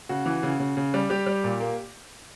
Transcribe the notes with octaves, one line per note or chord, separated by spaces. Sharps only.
C#3 F#4
E3
C#3
C#3
C#3
G3
G3 G4
G3
A#2
A#3